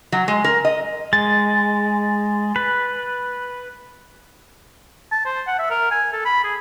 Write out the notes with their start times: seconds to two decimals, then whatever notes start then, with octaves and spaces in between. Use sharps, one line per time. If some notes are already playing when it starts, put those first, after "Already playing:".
0.12 F#3
0.28 G#3
0.44 A#4
0.65 D#5
1.13 G#3 A6
2.56 B4
5.11 A5
5.26 C5
5.47 F#5
5.59 E5
5.70 A#4
5.91 G#5
6.13 A4
6.25 B5
6.44 G#4